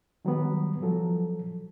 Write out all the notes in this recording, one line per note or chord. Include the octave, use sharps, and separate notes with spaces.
D#3 F#3 G3 B3
F3 F#3 A4